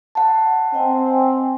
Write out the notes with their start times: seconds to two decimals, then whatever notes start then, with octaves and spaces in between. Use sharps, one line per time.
0.15 F#5 A5
0.74 C4 D#5 G5 G#5